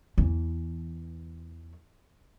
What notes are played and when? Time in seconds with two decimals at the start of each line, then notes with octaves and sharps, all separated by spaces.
0.18 E2 E3